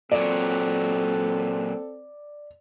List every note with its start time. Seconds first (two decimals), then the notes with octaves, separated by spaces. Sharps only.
0.12 A#2 F#3 C4 A4 D5